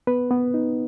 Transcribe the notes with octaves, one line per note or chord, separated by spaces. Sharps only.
B3 B4
B3
D#4